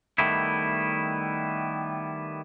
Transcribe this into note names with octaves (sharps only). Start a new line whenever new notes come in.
D#3 G3 A3 B3 E4